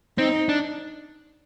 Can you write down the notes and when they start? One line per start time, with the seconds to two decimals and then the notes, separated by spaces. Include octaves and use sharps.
0.18 C4 D#4
0.49 D4